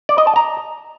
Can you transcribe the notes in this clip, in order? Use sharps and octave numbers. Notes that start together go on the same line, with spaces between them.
D5
D#5
A5
A#5